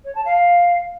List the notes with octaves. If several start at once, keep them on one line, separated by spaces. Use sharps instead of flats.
C#5
A5
F5